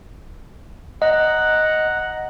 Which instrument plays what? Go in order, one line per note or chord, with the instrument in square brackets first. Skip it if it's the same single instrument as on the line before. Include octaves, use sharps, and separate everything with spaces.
[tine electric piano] D#5 [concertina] F#5 A#5